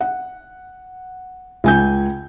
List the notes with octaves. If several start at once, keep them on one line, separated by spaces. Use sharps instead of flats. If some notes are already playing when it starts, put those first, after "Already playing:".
F#5
C#2 G#5 G6